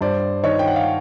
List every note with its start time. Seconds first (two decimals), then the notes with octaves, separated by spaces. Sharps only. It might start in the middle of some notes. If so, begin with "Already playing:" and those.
0.01 G2 C5 D5
0.44 D#3 C#5 D#5
0.59 G5
0.68 F#5
0.76 F5